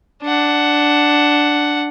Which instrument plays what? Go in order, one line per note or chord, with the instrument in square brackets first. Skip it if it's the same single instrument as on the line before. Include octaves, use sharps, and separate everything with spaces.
[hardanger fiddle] D4 F#5